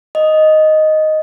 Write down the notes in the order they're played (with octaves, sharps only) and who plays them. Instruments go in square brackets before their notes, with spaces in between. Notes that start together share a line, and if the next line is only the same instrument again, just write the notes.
[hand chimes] D#5